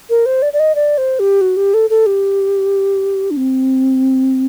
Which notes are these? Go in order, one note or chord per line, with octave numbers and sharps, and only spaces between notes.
A#4
C5
D5
D5
D#5
D5
C5
G4
F#4
G4
A4
A4
G4
D4
C4